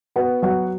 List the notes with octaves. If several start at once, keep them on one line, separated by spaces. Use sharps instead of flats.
B3 F#4 F#5
F#3 F#4 F#5